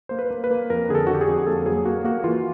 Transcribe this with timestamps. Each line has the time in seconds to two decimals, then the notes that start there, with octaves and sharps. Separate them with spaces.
0.09 A#3 C5
0.19 B4
0.31 A#3
0.44 B4
0.51 A#3
0.70 F2 A#4
0.89 D3 G#4
0.95 A4
1.07 D3 F#4
1.14 G4
1.21 G#4
1.28 F2
1.46 A#3 A4
1.66 F#3 G#4
1.85 A#3 F#4
2.04 A#3 F#4
2.24 E3 F4